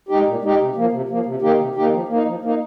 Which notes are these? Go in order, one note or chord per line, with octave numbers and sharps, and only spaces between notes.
G#3 D#4 G4
A#2
G#3 D#4 G4
C3
F3 A#3
C3
F3 A#3
C3
D#3 A#3 D#4 G4
C3
D#3 A#3 D#4 G4
F3
A#3 D#4
F3
A#3 D#4